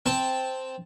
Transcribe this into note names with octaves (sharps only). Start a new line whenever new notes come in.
C4 A5